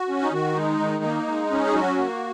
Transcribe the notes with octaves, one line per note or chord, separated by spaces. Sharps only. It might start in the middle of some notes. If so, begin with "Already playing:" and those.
Already playing: F#4
C#4
D#4
D#3 F#4
G#3 D#4
D#3
A#3
G#3
C#4
G#4
F#3 F#4
A#3